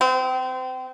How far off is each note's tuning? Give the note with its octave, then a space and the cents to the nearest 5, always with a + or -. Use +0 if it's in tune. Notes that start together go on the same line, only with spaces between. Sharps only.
C4 -30